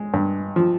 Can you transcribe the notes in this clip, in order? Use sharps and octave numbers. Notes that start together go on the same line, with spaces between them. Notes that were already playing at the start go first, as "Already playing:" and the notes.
Already playing: G#3
G2
F3